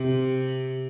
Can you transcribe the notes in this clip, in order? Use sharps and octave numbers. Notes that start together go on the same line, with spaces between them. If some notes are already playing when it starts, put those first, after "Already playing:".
Already playing: C3